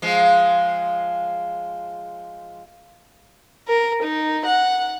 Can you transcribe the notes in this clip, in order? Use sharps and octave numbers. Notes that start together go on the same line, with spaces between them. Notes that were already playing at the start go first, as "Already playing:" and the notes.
F3 G#3
A#4
D#4
F#5